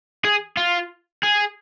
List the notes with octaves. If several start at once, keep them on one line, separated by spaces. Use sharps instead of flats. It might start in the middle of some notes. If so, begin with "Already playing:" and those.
G#4
F4
G#4